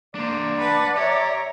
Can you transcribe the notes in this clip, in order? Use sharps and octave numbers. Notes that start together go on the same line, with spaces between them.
A#3 D4 C5 D5
B4 F#5 A5
G4 C#5 E5 A#5